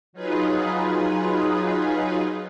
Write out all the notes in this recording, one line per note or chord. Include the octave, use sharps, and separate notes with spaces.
F#3 D#4 F4 G#4 B4